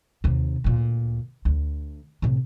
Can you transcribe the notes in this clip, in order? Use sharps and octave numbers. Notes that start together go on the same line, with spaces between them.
D#2 C3
D2 A#2
D2
A2 C3